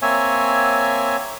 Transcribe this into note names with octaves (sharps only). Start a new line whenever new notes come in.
A#3 C4 C#5 E5 G#5